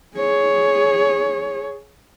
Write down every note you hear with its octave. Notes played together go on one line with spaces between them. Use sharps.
G#4 C#5